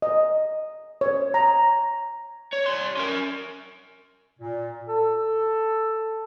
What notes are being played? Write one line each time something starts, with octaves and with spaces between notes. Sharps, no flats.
D#5
C#5
A#5
C#5
G3 C6
C#4 A#4
A#2
A4